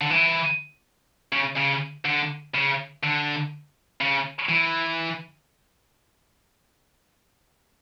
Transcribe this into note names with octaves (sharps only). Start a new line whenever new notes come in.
D3
E3
C#3
C#3
D3
C#3
D3
C#3
E3